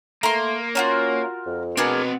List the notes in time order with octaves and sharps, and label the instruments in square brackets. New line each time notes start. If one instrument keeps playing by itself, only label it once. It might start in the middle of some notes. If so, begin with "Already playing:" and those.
[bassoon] A3 [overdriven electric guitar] A#3 [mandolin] A#5 C6
[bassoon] C#4 [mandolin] F4 F#4 A#4
[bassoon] F2
[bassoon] B2 [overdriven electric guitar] C4 F#5 [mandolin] D4 G#4 A#4